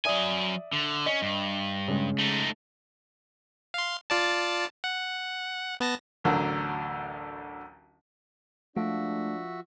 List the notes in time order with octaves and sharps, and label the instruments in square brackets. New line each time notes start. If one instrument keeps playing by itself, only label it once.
[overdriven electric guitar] F#3 G#5 [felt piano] D5 E5 D#6
[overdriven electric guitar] D3
[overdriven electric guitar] C#4 [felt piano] D#5
[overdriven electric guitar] G2
[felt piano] C#3 G#3
[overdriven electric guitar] A3 D#4
[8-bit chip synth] F5 C6
F4 D5 A5
F#5
B3 A5 A#6
[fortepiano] A1 D2 D3 F#3 A#4
[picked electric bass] F3 [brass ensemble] G#3 D4 [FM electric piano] A3 [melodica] F#4 E5